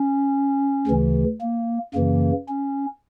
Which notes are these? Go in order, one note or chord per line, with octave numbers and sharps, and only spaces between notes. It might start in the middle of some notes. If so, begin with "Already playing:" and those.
Already playing: C#4
D2 C#3 E3
A#3
F#2 C#3 E3 A#3
C#4